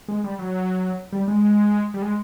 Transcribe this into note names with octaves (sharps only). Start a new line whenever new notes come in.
G#3
G3
F#3
G3
G#3
G3
G#3